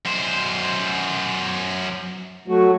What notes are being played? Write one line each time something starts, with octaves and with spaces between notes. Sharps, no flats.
F#2 C5
F#3 A3 F#4